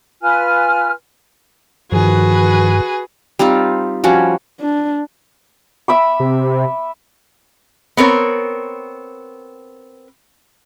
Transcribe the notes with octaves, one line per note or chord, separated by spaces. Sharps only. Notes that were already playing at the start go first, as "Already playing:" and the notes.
F4 B4 G#5 F6
G2 D#3 F3 F#4 G#4 B4
G3 C4 D#4 F4
F3 G3 C#4 F#4
D4
E5 B5 D6
C3
B3 C4 A#4 C#5